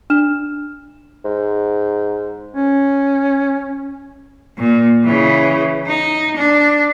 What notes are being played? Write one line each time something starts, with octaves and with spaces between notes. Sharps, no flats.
D4 F6 E7
G#2
C#4
A#2
C#3 E3
D#4
D4